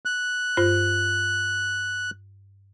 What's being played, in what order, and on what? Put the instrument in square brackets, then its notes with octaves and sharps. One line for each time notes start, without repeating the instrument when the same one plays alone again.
[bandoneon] F#6
[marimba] G2 F4 C5